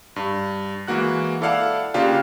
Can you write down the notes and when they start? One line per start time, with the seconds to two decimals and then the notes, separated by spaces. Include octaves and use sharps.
0.16 G2
0.88 E3 G#3 A#3 F#4 F#6
1.41 E4 A4 D5 F5 F#5 A5
1.94 C#3 A#3 D4 F4 G4